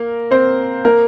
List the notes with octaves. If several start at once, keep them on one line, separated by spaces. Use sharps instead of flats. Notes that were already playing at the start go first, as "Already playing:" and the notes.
Already playing: A#3 A#4
C4 C5
A#3 A#4